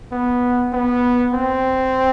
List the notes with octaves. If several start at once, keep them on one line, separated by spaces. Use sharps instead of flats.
B3
B3
C4